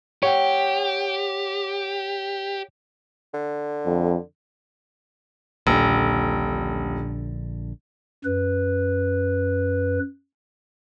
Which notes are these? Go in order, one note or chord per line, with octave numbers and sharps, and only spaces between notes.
G4 C#5 F#5 G5
D3
F2
D#1 A#1 D3
F#2 B4